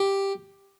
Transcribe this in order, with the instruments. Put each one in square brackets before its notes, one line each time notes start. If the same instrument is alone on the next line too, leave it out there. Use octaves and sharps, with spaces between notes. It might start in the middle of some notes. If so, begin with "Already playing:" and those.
Already playing: [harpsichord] G4